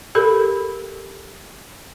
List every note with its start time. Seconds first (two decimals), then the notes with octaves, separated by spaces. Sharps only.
0.15 G4 A4 A#4 B5